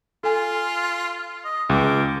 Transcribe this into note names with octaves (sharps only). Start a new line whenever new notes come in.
F4 A4 G#5
D#5
C#2 G#4 D6